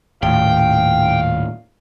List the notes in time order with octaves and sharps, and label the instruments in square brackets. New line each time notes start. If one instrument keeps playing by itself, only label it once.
[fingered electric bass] D#1 [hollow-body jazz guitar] A2 [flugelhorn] F5 [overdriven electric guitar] G5